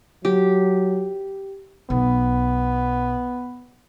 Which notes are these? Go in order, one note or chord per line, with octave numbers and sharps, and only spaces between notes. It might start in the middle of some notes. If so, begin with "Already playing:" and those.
F#3 G4
B1 B3